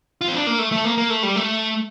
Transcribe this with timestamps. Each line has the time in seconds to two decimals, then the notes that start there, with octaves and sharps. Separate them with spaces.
0.21 F4
0.28 C4
0.34 D4
0.47 A#3
0.59 A3
0.72 A3
0.85 A#3
0.97 A#3
1.10 A3
1.23 G3
1.36 A3